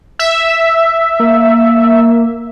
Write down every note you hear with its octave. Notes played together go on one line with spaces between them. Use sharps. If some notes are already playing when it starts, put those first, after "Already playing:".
E5
A#3